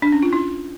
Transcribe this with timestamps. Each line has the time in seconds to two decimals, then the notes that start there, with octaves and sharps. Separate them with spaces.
0.02 D4
0.12 C#4
0.23 F4
0.33 E4